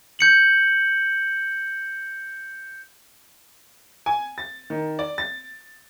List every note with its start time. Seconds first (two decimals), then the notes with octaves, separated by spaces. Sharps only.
0.19 G6 C#7 F#7
4.06 G#5
4.38 A6
4.70 D#3
4.99 D5
5.18 A6